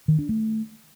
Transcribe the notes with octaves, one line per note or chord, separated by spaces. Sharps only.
D#3
D4
A3